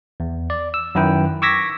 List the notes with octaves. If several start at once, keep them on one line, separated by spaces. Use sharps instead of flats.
E2
D5
E6
F#2 D#3 E4 B4 G5
C#6 D6 E6 G#6 A#6 B6